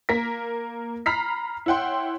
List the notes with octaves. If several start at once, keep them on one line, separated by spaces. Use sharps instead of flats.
A#3 A#4 A#6 B6
A#5 B5 F6 B6 C7
E4 C#5 F#5 G5 C6